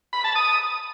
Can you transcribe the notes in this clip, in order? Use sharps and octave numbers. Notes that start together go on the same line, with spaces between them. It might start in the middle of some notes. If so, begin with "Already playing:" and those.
B5
A5
D#6